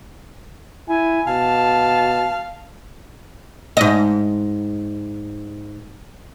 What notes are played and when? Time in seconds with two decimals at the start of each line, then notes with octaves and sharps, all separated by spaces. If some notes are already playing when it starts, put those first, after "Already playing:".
0.89 E4 G#5
1.27 B2 F5 A5
3.77 G#2 D#5